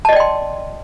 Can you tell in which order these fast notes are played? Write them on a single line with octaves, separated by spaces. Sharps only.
A5 D#5 D5 G5 C6